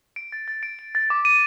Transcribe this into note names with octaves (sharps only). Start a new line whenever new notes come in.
D7
A6
A6
D7
D7
A6
D6
D#7